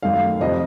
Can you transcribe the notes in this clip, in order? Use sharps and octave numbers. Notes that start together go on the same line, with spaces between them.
F#2 D#3 A3 F5
F2 C3 F3 D#5